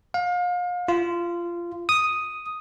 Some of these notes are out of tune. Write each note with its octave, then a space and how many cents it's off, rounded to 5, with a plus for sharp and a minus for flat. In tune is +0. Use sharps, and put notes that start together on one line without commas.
F5 +35
F4 -20
D#6 +0